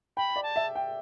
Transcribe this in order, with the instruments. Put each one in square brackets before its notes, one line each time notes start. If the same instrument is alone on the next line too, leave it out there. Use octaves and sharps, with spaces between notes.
[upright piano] G5 [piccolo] B5
[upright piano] D5
[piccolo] A5
[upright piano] E5
G5